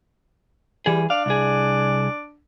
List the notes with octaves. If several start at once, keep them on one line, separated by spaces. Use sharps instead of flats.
E3 G3 G#4
D4 F5
C2 G#4